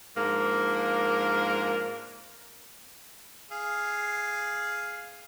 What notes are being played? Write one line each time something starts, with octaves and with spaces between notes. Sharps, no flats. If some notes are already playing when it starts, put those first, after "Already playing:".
G#2 F3 A#3 D4 A#4
G#4 F5